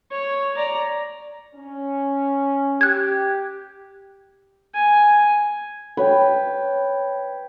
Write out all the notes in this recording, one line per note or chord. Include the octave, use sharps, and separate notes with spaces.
C#5
D5 A#5
C#4
G4 F#6 G#6
G#5
B4 C#5 G5